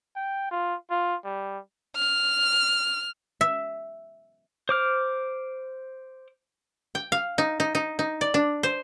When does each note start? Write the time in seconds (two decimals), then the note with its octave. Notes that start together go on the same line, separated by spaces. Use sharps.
0.16 G5
0.51 F4
0.90 F4
1.25 G3
1.97 F6
3.41 E5
4.69 C5 D6 F6
6.95 G5
7.12 F5
7.38 D#4
7.60 D#4
7.75 D#4
7.99 D#4
8.21 D5
8.34 D4
8.63 C5